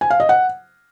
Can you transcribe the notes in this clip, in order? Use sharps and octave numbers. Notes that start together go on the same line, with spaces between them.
G#5
F5
D#5
F#5